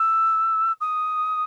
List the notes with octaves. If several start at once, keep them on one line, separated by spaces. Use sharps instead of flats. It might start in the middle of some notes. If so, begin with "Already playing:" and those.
Already playing: E6
D#6